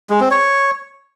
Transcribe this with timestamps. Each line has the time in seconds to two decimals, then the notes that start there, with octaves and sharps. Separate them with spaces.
0.10 G#3
0.20 C4
0.31 C#5